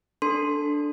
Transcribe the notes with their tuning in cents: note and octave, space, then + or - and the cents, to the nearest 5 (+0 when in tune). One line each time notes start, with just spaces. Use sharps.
D4 +0 A4 +0 C6 +0